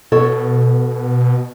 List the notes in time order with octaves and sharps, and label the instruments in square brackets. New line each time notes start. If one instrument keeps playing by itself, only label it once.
[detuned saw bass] B2 [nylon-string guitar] A4 C#5